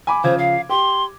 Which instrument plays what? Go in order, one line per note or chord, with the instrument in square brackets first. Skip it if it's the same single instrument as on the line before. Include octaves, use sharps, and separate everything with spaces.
[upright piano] G#5 B5 D6
[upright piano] C#3 F3 G#6 [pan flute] C5
[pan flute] F5
[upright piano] G4 [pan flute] C6